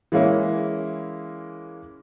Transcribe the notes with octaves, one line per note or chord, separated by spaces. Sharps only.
E3 G#3 A#3 C#4 E4